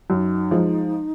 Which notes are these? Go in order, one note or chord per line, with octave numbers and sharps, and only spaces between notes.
F#2 D#4
F3 G#3